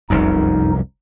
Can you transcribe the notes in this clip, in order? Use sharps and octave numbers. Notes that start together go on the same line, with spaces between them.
F1 C2 F#2 D#4